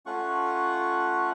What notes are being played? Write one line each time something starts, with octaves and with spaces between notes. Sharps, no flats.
A3 C#4 F4 F#5 C#6